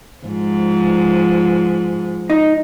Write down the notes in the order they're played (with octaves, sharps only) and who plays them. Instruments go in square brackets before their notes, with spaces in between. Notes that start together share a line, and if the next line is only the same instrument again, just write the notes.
[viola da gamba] G#2 F3
[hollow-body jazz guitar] D#4